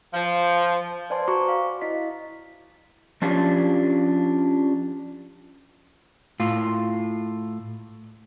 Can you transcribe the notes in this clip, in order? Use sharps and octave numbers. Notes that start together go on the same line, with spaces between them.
F3
B4 C5 D5 G#5 A5 C6
F#4 C5 A#5 C#6 D6
F5
E4 D#5 B6
F3 C#4 D4 F4 G4
A2 F4